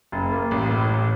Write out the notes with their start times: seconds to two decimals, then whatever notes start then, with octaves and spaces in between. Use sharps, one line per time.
0.12 F#1
0.32 A#3
0.51 A1
0.71 A2
0.89 A1